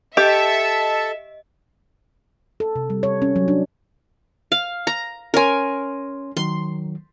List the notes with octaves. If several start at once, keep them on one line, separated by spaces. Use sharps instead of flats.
G4 A4 D#5 E5 A5 C#7
A4
C3
G3
C#5
C#4
F#3
D4
F5
A#5
C#4 A#4 C#5 G#5 C6
D#3 F#3 C6